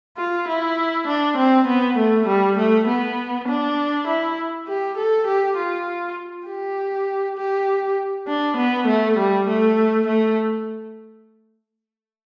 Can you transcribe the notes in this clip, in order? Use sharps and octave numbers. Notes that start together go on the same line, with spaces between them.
F4
E4
D4
C4
B3
A3
G3
A3
B3
D4
E4
G4
A4
G4
F4
G4
G4
D4
B3
A3
G3
A3
A3